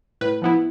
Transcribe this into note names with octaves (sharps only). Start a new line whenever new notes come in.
A2 B4
F3 B3 E4